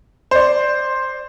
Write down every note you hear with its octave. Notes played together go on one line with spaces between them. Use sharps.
C5 D5